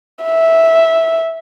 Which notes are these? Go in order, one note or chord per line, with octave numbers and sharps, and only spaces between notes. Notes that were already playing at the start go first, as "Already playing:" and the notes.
E5